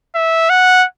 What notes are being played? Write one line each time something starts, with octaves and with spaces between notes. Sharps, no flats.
E5
F#5